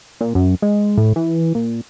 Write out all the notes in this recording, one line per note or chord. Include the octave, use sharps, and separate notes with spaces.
A#2
F#2
G#3
A2
E3
A#2